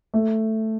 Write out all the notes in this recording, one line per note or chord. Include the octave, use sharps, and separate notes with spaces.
A3